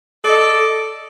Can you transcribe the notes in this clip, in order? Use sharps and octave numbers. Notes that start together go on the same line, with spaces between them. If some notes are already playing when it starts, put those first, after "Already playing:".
A4 D5 D#5